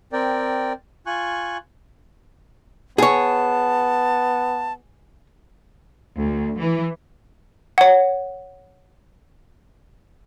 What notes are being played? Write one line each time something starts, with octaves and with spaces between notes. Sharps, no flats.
C4 A#4 D5 G5
F4 G#5 C#6 F#6
B3 G#4 C#5 A5
D2
E3
C#5 F#5